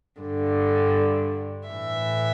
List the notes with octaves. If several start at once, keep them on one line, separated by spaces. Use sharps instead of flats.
G2 D3
A2 E3 E5